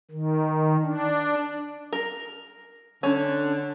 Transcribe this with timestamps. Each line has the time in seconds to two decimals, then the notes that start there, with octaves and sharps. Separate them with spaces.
0.11 D#3
0.84 D4
1.93 A#4
3.03 D3 C#4